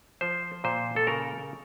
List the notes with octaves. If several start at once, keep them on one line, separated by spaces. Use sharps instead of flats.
F3 C5
A#2 C5
A4
C#3 A#4